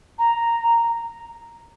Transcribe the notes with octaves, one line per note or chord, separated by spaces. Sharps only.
A#5